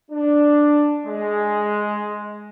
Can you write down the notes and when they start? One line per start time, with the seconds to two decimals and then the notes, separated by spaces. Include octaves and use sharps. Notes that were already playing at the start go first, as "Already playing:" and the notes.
0.11 D4
1.06 G#3